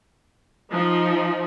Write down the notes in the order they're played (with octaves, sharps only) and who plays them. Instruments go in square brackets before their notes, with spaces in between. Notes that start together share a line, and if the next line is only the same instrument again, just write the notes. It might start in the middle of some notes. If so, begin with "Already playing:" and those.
[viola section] F3 D#4